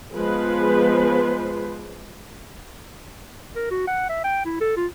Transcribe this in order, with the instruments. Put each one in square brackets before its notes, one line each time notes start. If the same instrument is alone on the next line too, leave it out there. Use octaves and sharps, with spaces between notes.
[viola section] F3 G#3 B3 B4 C5
[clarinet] A#4
F#4
F#5
E5
G5
E4
A4
F4